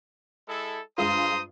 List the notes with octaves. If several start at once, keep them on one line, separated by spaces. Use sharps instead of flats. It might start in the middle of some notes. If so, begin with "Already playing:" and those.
G#3 E4 A4
G2 G#3 F4 C5 A#5 C6 D#6